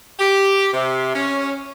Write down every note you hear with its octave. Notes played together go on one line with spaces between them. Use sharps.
G4
C3
C#4